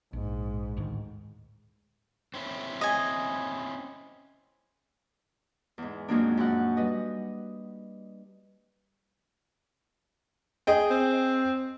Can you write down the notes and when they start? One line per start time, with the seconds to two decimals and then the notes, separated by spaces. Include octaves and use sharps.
0.13 A#1 G#2
0.77 D2 A2 D#3
2.34 C4 C#4 E4
2.81 D#5 G#5
5.78 E2 G#2
6.08 F2 A#2 F#3 G#3 A#3 D4
6.37 F#2 F#5
6.77 G3 B4 D#5
10.67 G#4 D#5 G5
10.91 C4